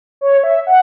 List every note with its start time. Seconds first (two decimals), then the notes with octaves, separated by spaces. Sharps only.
0.21 C#5
0.44 E5
0.67 F#5